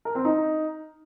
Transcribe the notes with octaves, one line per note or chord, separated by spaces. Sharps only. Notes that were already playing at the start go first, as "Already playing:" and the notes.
A#4
C4
D#4